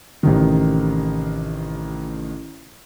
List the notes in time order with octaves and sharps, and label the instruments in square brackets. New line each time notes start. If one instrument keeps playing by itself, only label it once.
[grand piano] A1 C3 D#3